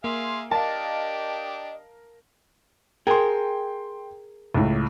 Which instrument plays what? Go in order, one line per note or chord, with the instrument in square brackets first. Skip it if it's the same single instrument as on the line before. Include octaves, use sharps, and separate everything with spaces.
[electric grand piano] A#3 [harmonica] G#4 E5 F5 [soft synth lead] C6
[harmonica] D4 G4 [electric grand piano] A#4 F5 [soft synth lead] D#5 [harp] A5
[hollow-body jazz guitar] G#4 A#4 [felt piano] G5 C6
[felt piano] C#2 A2